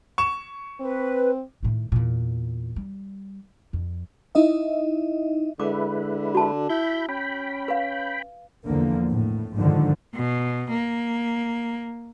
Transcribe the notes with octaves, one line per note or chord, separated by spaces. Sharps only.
C#6 E7
C4 B4
A2 D#3
E2 A#2
G3
F2
D#4 E4 D#5 E5
D3 G#3 E4 B4 D6
F#4 A5
E4 B5 G6
C#4 G5 B5
B4 F5
E2 D3 F3 A#3
A2
G#2 D3 D#3 F3
B2
A#3